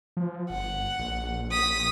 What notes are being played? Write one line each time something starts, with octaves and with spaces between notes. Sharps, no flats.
F3
G1 F#5
A#1
D#6 B6